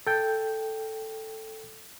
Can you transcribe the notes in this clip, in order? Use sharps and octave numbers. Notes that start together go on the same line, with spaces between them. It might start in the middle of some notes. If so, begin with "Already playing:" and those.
A4 G5